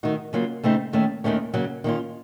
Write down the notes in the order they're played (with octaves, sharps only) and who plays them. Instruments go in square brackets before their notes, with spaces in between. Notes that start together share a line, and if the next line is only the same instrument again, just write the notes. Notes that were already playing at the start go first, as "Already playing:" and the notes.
[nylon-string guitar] D#3 A3 D#4 F#4
C#3 F#3 A#3 F4
C#3 A3 C4 D#4
D#2 D#3 A3 C#4
D#2 D#3 A3 C#4
C#3 F#3 A#3
D#3 A#3 C#4 F4